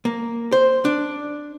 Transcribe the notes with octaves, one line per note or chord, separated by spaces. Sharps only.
A#3
C5
D4